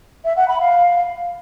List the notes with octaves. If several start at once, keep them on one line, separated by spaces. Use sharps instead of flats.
E5
F#5
B5
F5